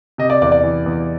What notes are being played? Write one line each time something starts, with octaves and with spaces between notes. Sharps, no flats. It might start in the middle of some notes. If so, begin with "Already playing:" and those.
C3 D#5
D5
E2 D5
D5
E3
E2